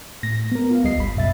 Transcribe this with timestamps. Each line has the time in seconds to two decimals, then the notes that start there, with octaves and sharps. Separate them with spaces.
0.23 A2 A#6
0.52 B3 A#4
0.71 F4 F5
0.84 D2 G3 D#5 C7
0.98 G1 B5
1.16 F#2 B2 E5 A6